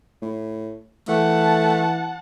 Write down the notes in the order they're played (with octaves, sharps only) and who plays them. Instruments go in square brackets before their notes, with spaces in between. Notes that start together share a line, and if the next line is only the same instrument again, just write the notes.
[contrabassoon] A2
[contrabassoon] E3 [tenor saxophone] A3 [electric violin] F#5 A5